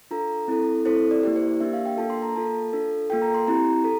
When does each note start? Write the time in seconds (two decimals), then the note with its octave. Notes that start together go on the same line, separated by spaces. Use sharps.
0.11 D4 F4 A4 A#5
0.48 C4 E4 A4
0.85 C4 E4 A4 C5
1.11 D5
1.23 A#3 E4 G4 D5
1.36 C5
1.48 D5
1.60 A#3 D4 G4 E5
1.73 F5
1.85 G5
1.97 A#3 D4 F4 A4 A5
2.10 C6
2.22 A#5
2.35 A#3 F4 A4 A5
2.73 D4 F4 A4
3.10 A#3 F4 A4 G5
3.22 A#5
3.35 C6
3.47 C4 E4 G4 A#5
3.84 A4